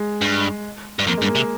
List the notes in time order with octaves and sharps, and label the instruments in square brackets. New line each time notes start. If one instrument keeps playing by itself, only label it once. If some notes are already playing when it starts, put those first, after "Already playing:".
Already playing: [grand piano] G#3
[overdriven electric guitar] G2
G2
[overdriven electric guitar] F2 [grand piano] A#3
[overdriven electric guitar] G2 [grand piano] G#3
[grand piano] A#3
[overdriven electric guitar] C3